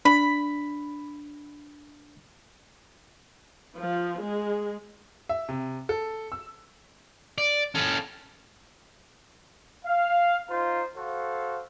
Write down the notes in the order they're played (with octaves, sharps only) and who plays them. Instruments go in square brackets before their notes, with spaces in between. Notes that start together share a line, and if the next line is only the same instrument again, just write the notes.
[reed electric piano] D4 [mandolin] B5
[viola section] F3
G#3
[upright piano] E5
C3
A4
E6
[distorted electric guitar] D5
C#4 A4
[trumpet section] F5
D#4 F4 C5 A#5
F#4 A4 C5 F5